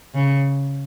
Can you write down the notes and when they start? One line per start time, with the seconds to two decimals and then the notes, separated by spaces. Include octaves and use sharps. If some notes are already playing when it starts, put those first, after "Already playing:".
0.14 C#3